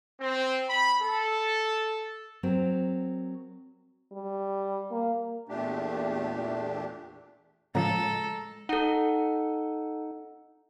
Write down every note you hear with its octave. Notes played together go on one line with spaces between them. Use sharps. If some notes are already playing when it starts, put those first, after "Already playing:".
C4
B5
A4
F#3 C4 A#4
G3
A#3
E2 A#2 A3 D4 G4
A2 C#3 F3 G#3 A4 A#5
D#4 A4 F#5